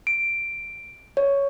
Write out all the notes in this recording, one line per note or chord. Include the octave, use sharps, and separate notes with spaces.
D7
C#5